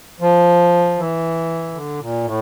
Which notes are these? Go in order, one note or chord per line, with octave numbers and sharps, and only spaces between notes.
F3
E3
D3
A#2
A2